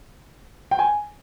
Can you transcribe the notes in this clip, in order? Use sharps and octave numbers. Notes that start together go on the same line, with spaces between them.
G5
G#5